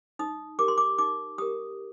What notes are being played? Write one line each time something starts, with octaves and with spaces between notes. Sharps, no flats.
D#4 D#6
G4 A#4 D6
C6
D6
D#4 D6
G4 A#4 D#6